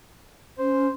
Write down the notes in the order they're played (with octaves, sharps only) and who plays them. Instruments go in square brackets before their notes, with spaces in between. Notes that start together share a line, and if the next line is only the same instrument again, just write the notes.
[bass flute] C#4 [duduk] C5